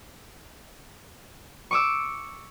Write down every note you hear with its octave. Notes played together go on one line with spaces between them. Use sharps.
C#6 D6 E6